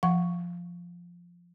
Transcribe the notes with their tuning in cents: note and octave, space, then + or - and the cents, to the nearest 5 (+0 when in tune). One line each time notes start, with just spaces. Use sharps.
F3 +0 F#5 +0 C#6 +0